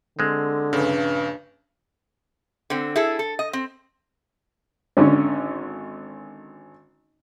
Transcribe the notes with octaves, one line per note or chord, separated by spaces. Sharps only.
D3 G#3 C4
A#1 G2 C#3
D3 C4
E4 G#4 A4
A4
D#5
C4
G#1 D3 C#4